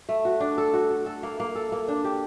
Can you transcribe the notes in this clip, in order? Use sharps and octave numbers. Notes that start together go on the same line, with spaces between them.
A3
F#4
D4
A4
F#4
A4
A4
A#3
A#3
A4
A#3
D4
G4